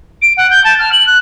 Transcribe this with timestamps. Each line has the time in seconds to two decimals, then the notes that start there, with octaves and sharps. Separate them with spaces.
0.21 D7
0.37 F#5
0.50 G6
0.64 A5
0.78 F6
0.92 F#7
1.06 F#6